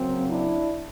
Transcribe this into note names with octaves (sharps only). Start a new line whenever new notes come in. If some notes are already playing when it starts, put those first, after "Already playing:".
Already playing: C#3 F#3 A#3 C4
D4 E4